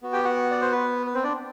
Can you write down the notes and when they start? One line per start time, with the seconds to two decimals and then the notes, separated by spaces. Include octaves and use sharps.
0.02 B3 F#4
0.13 G4 G5
0.25 F#4 F#5
0.51 D5
0.62 C5
0.72 B4
1.07 B4
1.15 C4 C5
1.24 D4 D5